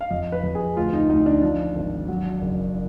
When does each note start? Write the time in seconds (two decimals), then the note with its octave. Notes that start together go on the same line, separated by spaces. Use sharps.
0.01 F5
0.10 F2 D#5
0.32 B4
0.43 F2
0.55 G#4
0.76 D2 F4
0.93 D#4
1.09 D2 D#4
1.26 D4
1.42 F3 D4
1.76 G#1
2.08 F#3
2.42 F#1